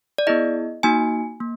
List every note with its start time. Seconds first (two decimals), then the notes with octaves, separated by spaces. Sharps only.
0.18 D5
0.27 B3 E4 G#4 D#5
0.83 A#3 D#4 F#4 G#5
1.40 A#3